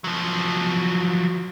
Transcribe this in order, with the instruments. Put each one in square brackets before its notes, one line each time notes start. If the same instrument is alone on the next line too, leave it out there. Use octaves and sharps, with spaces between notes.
[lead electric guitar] F3 F#3